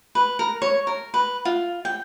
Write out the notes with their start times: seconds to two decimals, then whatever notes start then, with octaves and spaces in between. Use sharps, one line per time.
0.15 B4
0.39 A#4
0.62 C#5
0.87 A#4
1.14 B4
1.45 F4
1.85 G5